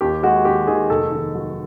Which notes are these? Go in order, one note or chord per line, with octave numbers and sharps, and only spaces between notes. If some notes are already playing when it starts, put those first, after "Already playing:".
D#2 G4
G#3 F#4
D#2 G4
D#3 G#4
F1 A4
D#3
F#3